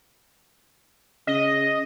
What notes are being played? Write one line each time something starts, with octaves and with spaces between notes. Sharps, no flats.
C#3 D#5